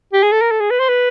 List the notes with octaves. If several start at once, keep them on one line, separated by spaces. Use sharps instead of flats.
G4
G#4
A4
A#4
A4
G#4
B4
C5
B4